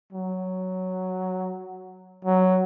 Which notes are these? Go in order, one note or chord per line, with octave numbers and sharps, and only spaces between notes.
F#3
F#3